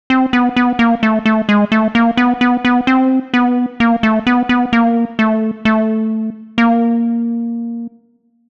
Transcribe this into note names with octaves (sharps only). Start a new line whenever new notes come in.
C4
B3
B3
A#3
A3
A3
G#3
A3
A#3
B3
B3
B3
C4
B3
A#3
A3
B3
B3
A#3
A3
A3
A#3